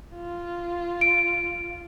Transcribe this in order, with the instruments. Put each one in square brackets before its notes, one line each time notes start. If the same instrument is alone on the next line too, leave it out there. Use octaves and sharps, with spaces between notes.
[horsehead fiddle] F4
[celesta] D7